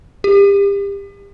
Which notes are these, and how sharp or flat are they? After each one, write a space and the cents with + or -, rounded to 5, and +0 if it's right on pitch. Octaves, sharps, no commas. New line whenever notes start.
G4 +30